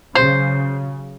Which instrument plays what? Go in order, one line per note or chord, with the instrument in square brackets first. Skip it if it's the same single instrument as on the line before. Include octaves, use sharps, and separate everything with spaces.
[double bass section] C#3 F#3 [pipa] C5